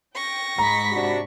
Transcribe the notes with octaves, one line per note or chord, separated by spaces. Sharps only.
G5 C#6 A#6
G#2 A#5 B5 B6
C3 D4 F#4